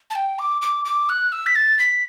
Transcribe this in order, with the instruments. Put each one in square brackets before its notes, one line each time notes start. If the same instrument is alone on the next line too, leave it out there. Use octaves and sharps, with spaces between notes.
[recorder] A5
G5
D6
D6
D6
F#6
E6
B6
A6
B6